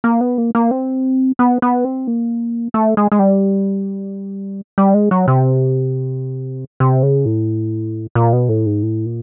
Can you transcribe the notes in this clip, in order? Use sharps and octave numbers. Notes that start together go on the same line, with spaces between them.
A#3
B3
A#3
A#3
C4
B3
B3
C4
A#3
A3
G#3
G#3
G3
G3
G#3
F#3
C3
C3
C#3
A2
A#2
B2
A2
G#2
A2
A#2